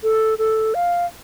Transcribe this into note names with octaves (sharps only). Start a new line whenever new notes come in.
A4
A4
F5